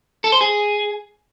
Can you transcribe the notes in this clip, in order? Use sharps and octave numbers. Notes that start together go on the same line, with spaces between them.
A4
C5
G#4